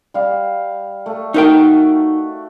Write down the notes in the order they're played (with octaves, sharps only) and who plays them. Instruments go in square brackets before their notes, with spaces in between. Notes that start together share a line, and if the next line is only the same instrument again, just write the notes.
[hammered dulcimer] G3 F5
A3
[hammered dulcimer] A3 F#4 D#5 [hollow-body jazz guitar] D#4 A#4 G5